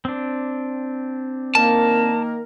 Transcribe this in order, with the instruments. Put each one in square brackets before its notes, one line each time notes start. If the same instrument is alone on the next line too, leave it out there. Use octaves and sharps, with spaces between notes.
[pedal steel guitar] C4 D4
[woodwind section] D#3 A#3 A#4 [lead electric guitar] A5